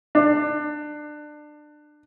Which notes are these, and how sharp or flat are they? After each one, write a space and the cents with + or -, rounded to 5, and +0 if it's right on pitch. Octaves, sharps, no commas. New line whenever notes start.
D4 +25